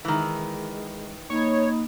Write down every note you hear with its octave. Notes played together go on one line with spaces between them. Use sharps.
D#3 E3 G#3
A#3 D#4 C#5 B5